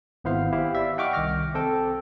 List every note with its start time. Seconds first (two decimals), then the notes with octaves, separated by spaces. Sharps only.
0.24 G#1 B3 E4 C5 F5
0.52 E4 G4 E5 F5
0.75 D5 E5
0.97 D#5 F#5 G5 C#6 D6 F6
1.13 C2 D#3 D6 F6 A#6
1.54 C4 A4 G5